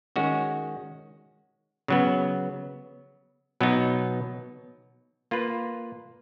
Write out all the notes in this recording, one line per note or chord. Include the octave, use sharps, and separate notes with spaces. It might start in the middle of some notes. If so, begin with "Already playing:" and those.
D#3 G#3 C#4 F#4
C#3 F#3 B3
B2 F#3 B3 D#4
A#3 F4 B4